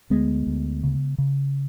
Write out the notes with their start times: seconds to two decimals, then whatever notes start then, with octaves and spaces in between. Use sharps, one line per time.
0.10 D2 G#3 B3
0.47 D2
0.83 C#3
1.18 C#3